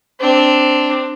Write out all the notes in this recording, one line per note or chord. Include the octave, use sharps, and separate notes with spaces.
C4 D4